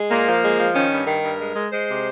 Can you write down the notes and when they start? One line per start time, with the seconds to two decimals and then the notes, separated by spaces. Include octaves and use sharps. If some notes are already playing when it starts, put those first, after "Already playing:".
Already playing: G#3
0.10 A#2 A#3
0.27 F3
0.43 G#3
0.59 F3
0.74 D#3 C#4
0.91 G2
1.07 D#3 A#4
1.24 G2
1.40 G#3
1.55 G#3
1.72 G#3 C5
1.89 C3